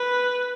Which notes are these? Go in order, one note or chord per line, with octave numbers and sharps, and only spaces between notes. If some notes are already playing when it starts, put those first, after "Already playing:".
Already playing: B4